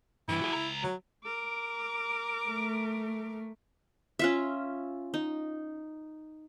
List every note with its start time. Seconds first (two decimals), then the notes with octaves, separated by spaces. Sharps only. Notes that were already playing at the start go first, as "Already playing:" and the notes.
0.29 G2 E3 E4
0.42 F#4 G#4
0.53 C#2 A#5
0.84 F#3
1.24 A#4 D6
2.48 A3
4.19 C#4 F4 E5
5.14 D#4